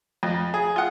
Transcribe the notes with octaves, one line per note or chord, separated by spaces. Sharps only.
F2
G#4
F4 F#5